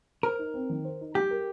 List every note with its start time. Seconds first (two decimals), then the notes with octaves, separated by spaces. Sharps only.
0.23 A#4 C5
0.39 D#4
0.54 C4
0.69 D#3
0.85 C5
1.01 D#4
1.15 G3 G4
1.31 A#4